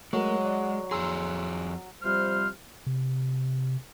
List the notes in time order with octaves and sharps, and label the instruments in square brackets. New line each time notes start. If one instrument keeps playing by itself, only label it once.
[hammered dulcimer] F#3 [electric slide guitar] G#3 [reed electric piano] A3 A#4
[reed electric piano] D5 F#5
[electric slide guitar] F2 G#4 [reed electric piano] A#5 C6 E6
[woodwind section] C3 F3 G3 C5 F6
[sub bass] C3